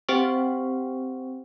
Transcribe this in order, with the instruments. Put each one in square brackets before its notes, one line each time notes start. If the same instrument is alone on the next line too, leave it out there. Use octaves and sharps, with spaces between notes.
[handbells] C4 G4 C5 F#5 G5 C#6